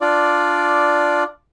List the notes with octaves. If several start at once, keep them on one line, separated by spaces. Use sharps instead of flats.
D4 F4 D5